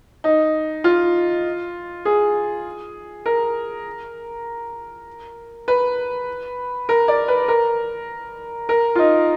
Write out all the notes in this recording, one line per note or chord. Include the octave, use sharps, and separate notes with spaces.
D#4
F4
G#4
A#4
B4
A#4
D5
B4
A#4
A#4
F4
D#4